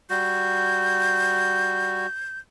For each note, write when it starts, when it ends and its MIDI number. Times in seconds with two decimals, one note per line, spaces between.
0.10 2.07 55
0.10 2.07 66
0.10 2.39 91